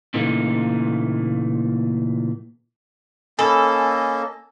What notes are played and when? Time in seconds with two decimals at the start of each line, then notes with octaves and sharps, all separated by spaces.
0.14 A#2 C#3 E3 A3 A#3 D#4
3.39 A#3 C#4 A4 D#5 G#5 B5